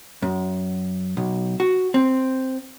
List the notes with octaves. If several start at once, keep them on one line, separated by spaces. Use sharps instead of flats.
F#2
B1
F#4
C4